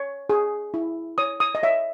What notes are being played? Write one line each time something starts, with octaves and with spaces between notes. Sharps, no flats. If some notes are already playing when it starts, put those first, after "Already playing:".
Already playing: C#5
G#4
E4
C#5 D#6
D#6
D#5
C#5 E5